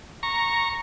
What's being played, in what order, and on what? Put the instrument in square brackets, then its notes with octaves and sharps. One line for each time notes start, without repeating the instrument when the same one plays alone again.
[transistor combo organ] A#5 C#6